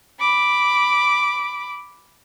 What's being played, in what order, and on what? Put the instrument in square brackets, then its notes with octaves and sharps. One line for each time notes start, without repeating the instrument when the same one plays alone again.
[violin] B5 D6